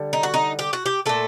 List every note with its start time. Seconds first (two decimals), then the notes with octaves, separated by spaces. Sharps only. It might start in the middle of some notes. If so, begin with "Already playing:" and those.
Already playing: D3 G3
0.13 D#4
0.23 F#4
0.34 D#4
0.59 G4
0.73 F#4
0.86 G4
1.06 A#2 A3 A4